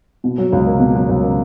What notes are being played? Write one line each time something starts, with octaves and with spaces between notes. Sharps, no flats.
B2
F#3
C#2
A#3
B2
F#3
C#2
A#3